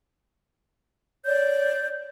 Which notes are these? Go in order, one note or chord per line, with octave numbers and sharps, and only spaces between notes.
C#5 D5 G6